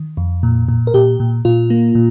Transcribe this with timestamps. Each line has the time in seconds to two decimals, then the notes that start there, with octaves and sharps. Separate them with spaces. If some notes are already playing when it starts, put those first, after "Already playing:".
Already playing: D#3
0.17 F2
0.43 A#2
0.68 A#2
0.87 A#4
0.94 A#2 G4
1.20 A#2
1.45 A#2 F4
1.70 A#3
1.95 A#2